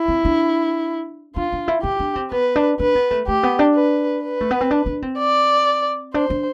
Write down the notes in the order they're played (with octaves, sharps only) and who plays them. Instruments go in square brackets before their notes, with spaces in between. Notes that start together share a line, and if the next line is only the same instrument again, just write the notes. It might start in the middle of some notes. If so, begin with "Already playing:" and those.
Already playing: [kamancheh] E4
[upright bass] C4
D4
[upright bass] D4 [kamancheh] F4
[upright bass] D4
E4
[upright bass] E4 [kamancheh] G4
[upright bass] D4
C4
[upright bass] B3 [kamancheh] B4
[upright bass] D4
[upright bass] D4 [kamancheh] B4
[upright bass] B3
A3
[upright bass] A3 [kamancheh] G4
[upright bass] B3
D4
[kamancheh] B4
B4
[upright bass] A3
B3
C4
D4
D4
C4
[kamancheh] D5
[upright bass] D4 [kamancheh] C5
[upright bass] D4